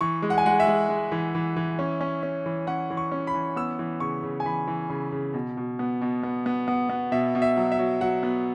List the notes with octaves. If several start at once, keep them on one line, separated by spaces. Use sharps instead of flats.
E3 C#6
G#3
F#5
G#5
G#3 F#5
E5
G#3
G#3
E3
E3
E3
C#4
C#4
C#4
E3
C#4 F#5
E3
C#6
C#4
B5
E3
B3 E6
E3
C#3 C#6
C#3
G#5
E3 B5
E3
C#3
C#3
B2
B2
B3
B2
B3
B3
B3
B3
B2 E5
B2
E5
F#3
E5
F#3
F#3 F#5
B3